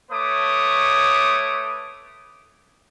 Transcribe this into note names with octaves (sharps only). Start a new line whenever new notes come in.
A3 B4 C#5 D6 D#6